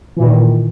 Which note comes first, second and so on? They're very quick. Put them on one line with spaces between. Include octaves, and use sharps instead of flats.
E3 A#2 D#3